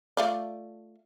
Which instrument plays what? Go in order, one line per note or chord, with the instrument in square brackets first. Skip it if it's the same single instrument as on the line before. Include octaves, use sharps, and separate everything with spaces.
[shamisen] A3 F4 D5